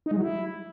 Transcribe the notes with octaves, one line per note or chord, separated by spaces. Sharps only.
D#4
G#3
F#3
E4